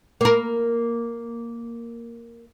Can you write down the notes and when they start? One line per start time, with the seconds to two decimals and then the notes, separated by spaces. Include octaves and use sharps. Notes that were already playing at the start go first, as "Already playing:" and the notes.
0.21 A#3 A#4